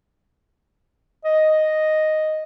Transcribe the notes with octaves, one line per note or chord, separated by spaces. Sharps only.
D#5